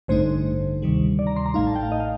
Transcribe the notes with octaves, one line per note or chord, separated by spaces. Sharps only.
A1 G2 D3 A3 D#4 C5
D2 C3 D#3 G3
D5
A#5
C6
A#5
A1 A2 A3 D#4 F5
A5
G5
F5
D#5
F5